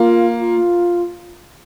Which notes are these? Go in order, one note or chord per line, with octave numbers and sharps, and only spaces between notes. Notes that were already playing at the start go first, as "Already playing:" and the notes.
Already playing: A#3 F4
F4